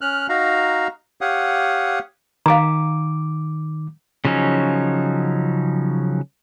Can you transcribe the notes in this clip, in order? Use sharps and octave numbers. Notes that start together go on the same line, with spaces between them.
C#4 F6 F#6
D#4 F#4 F5 A#5
G4 C#5 F5 F#5 D#6
D#3 F5 A#5 D6
C#3 F3 F#3 C#4 D#4